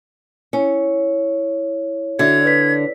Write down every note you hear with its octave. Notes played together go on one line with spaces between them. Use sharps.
C#4 E4 C#5
D3 F#4 D5 E5 G#6
B4 D5 B6